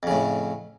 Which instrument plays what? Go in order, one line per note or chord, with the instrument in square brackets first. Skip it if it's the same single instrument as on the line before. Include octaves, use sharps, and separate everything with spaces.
[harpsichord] F2
C#3
A2